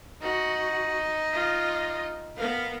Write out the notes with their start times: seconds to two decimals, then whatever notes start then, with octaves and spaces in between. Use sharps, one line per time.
0.22 D#4 F#4
1.33 F4 D#5
2.36 B3 A#4 B4 F5